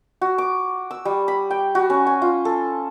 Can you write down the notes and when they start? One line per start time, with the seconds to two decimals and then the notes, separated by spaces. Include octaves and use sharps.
0.21 F#4
0.38 D6
0.91 E6
1.05 G3
1.28 B5
1.51 G5
1.75 F#4
1.90 C#4
2.07 G#5
2.22 F4
2.45 A4